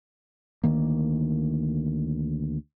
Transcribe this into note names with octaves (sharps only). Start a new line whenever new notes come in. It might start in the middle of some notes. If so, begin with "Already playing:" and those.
D2 D#3 A#3